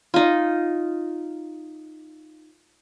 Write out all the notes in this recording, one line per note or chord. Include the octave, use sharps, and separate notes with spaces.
D#4 F4